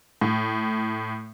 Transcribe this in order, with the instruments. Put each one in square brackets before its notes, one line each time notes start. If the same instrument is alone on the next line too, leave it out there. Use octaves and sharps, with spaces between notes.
[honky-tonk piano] A2